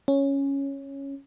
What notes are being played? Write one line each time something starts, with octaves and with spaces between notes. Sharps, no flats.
C#4